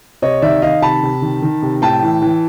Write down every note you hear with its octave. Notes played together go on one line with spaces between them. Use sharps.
C3 C#5 D#5
D#3 D5 E5
D#3 D#5 F5
C3 A5 B5
C3
D#3
D#3
C3
A2 G5 A5
E3
E3